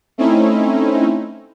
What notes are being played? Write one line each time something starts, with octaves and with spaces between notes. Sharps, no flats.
A3 C4 C#4 D#4 E4